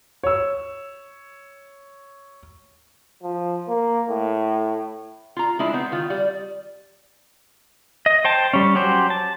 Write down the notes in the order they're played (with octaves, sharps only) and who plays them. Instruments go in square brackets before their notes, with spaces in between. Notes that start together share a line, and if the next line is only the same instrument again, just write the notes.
[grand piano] C#5 E6
[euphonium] F3
A#3
A2
[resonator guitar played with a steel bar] F4 A#5
G#3 D4 E4 F4
B3 C4 D#4
D#3 F4
G3
[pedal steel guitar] D#5
C5 G5 A5
G3 C#4
F#3 C#4 G4 C5
A5